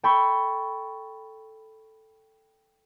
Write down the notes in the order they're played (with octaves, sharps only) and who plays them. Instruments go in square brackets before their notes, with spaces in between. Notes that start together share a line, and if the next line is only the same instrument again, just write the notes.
[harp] A4 G5 B5 C#6